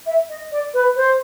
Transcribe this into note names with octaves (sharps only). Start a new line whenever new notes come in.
E5
D#5
D5
B4
C5